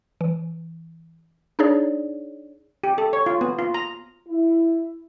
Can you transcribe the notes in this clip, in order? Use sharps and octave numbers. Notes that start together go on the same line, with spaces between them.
E3
D4 D#4 G#4 C#5 D5
G4
A4
C#5
F4
B3
F4
A#5
E4